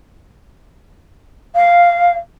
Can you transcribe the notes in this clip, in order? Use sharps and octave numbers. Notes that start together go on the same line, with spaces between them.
F5